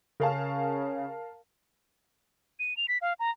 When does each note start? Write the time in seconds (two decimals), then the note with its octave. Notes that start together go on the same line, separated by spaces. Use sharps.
0.20 C#3 A#4 F5 A5
2.60 D#7
2.77 F7
2.88 B6
3.02 F5
3.20 A#5